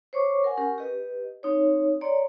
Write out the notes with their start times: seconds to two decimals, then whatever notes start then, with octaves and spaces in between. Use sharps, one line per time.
0.13 C5 C#5 C#6 D6
0.44 A#4 F#5 G#5
0.57 C#4 G4 A#4
0.78 G4 B4 D#5
1.43 C4 D#4 C#5
2.01 C#5 D5 A#5 C6